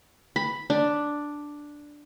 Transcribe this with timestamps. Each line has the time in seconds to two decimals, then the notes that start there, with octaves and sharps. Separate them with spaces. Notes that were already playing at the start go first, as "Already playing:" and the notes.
0.36 B5
0.70 D4